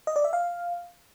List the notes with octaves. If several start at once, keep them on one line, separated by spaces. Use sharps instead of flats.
D#5
D5
E5
F5